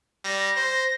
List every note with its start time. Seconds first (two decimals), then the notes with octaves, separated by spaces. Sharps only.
0.25 G3 A#6
0.56 C5